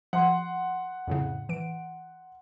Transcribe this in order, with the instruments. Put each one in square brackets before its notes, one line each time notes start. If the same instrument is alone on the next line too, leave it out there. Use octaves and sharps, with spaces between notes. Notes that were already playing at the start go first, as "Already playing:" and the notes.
[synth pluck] F3 [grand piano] F#5 C6
[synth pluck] F2 A2 C#3
E3 D7